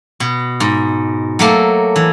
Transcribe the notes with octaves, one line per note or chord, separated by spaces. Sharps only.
B2
G#2
F#3 A3 A#3
E3